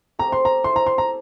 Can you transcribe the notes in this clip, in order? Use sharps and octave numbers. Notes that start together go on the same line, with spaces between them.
A3 C4 G4 A#5
C6
A#5
E4 A4 C5 E5 C6
A#5
C6
A#5